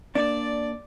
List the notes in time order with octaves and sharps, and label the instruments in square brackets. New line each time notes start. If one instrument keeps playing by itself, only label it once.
[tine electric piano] A#3 [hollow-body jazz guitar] D4 [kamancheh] D5